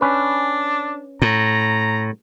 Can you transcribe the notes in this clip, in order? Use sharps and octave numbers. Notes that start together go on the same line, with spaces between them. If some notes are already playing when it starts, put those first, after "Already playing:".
C#4 D4 B4
A2 A#5